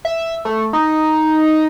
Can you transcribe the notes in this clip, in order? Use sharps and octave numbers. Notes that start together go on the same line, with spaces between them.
E5
A3
D#4